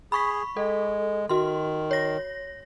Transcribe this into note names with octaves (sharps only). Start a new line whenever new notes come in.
G#4 B5 C#6 B6
G#3 A4
D#3 F#4 C6
C#5 A#6